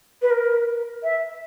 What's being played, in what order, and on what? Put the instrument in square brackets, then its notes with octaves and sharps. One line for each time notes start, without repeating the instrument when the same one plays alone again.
[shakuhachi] B4
A#4
E5